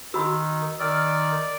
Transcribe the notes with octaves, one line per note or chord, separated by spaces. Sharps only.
D#3 F#4 B5 D#6 E6
D#3 D5 E6 F6